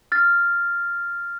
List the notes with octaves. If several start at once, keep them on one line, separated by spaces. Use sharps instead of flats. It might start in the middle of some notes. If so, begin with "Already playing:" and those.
F6 A6